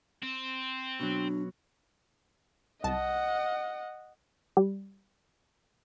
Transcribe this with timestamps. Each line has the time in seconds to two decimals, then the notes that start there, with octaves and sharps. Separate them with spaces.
0.22 C4
1.00 B2 F#3 D4
2.84 C2 D#5 F#5 A5
4.57 G3